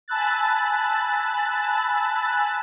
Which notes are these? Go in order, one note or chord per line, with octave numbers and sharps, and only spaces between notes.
G#5 A5 B5 E6 F#6 A6